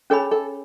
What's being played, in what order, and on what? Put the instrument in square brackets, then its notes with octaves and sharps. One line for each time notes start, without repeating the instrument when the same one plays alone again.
[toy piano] C#4 G#4 C#5 G#5 B5 [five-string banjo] A4
[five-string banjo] A4